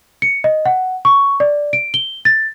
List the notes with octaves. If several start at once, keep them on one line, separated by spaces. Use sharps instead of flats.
C#7
D#5
F#5
C#6
D5
D7
G7
A6